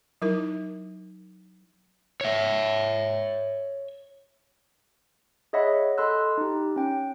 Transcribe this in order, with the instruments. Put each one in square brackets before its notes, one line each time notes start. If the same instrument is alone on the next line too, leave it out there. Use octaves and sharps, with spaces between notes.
[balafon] F#3 D#4 E4 A#4
[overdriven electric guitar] C#5 E5
[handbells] G#4 C#5 D#5 E5 F#5 B5
A4 D#5 B5 C6 E6 F#6
D#4 G4
C#4 G5